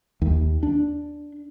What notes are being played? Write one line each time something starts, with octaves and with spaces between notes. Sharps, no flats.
D#2
D4